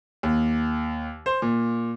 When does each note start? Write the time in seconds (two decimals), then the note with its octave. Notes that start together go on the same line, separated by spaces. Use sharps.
0.23 D#2
1.26 C5
1.42 A#2